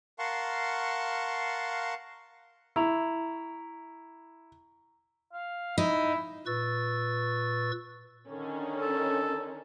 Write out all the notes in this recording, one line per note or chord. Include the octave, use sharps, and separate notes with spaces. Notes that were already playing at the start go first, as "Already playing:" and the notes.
A#4 F5 F#5 A5 C6 C#6
E4 A#5 C#6 F7
F5
D#4 E4
A#2 B4 C#6 E6 A6
D3 D#3 C#4
A4